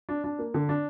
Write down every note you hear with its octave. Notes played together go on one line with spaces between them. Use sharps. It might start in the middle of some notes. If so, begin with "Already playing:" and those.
D4
D4
A#3
D3
D4